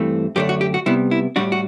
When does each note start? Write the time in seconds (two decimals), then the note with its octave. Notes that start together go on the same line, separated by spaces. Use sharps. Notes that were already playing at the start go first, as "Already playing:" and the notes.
Already playing: G2 E3 A3 C4
0.36 F#2 D3 A3 D4 G4
0.49 F#4
0.61 G4
0.74 F#4
0.86 C3 G3 B3 E4
1.11 E4
1.36 A2 G3 D4 F#4
1.52 F#4